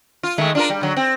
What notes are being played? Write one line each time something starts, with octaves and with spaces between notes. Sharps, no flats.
F4
D#3 G#3 A3
D4 F4 A#4
G3
D3 F#3
C4